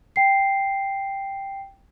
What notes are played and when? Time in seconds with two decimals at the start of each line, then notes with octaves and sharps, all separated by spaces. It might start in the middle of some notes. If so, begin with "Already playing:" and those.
0.16 G5 C7